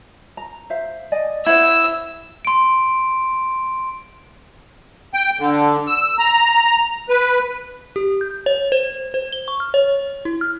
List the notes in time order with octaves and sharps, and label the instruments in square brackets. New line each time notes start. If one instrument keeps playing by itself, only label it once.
[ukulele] A#5
C5 E5 F5
D5 D#5 G#5
[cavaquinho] E4 [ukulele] C5 F#5 [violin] E6
[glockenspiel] C6 D7
[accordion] G5
D3
E6
A#5
B4
[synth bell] G4
G6
C#5
C5
C5
G7
C#6
F6
C#5
E4
F6